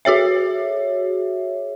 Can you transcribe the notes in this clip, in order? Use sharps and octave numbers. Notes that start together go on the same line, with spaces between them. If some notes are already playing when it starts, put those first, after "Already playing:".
F#4 G#4 C#5 E5